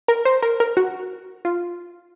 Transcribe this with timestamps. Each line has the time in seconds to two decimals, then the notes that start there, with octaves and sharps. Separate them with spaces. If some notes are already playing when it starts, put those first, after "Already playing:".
0.08 A#4
0.25 C5
0.42 A#4
0.60 A#4
0.77 F#4
1.45 F4